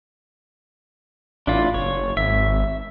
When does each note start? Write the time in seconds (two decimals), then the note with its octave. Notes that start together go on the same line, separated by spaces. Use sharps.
1.47 A1 D4 E4 F4
1.74 F#1 C#5
2.17 G#1 E5